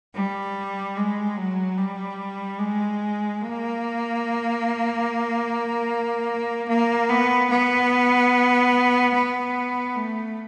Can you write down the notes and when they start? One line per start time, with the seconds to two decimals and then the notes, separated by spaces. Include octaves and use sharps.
0.14 G3
0.96 G#3
1.37 F#3
1.77 G3
2.59 G#3
3.41 A#3
6.69 A#3
7.09 B3
7.50 B3
9.14 B3
9.95 A3